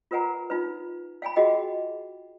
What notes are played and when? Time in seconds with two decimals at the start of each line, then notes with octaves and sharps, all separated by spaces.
0.11 F4 A#4 B4 F#5 G#5 A#5
0.50 D#4 F4 B4
1.22 F5 G5 G#5 B5
1.36 F4 F#4 G#4 D#5 F#5 G5